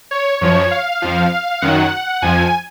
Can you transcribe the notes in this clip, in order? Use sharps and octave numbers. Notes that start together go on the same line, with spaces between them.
C#5
F#2 F3 C#5
F5
F2 F3
F#2 D#3 F#3 F#5
F2 F3 G#5